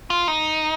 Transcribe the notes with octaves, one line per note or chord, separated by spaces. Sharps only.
F4
D#4